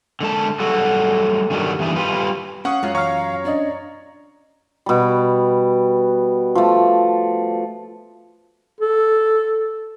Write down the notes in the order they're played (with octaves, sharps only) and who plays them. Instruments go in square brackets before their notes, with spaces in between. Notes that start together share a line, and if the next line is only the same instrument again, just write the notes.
[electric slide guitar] D3 G#3 A5
F#3 G3 F#4 G#4 A4
G2 D#3 F#3 G3
G2 E3 G#4
G3 F4 B4
[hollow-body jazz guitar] C#4 [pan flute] F5 [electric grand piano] F#5 C#6 D#6
[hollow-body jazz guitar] F#2 F4 [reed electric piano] G#3 [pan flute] C#5
[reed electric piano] E3 F6 [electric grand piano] C#5 A#5 C#6 [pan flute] F5
[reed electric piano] C#4 D4 D#5 [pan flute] D5
[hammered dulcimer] B2 G3
F3 A3
[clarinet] A4